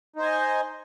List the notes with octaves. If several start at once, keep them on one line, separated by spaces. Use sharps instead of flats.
D#4 C5 D#5 G#5